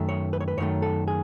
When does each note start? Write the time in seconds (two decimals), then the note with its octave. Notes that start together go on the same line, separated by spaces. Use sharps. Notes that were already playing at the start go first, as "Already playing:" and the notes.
Already playing: F#2 D#3 A3
0.09 C#5
0.33 B4
0.40 C#5
0.48 B4
0.57 F#2 D#3 A3 C#5
0.82 A4
1.08 G#4